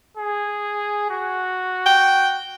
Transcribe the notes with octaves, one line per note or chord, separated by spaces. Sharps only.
G#4
F#4
G5